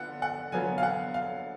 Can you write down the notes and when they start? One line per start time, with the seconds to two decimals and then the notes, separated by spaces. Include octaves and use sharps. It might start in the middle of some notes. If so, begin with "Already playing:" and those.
Already playing: D3 B3 F4 F#5
0.22 F#5
0.52 D3 F#3 B3 F4 G#5
0.78 F5
0.83 F#5
1.14 F5